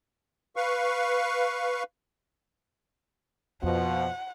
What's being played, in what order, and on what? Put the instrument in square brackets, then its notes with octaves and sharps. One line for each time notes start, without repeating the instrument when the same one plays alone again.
[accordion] B4 F5 C#6
[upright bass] F2 [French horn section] B2 F3 [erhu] F#5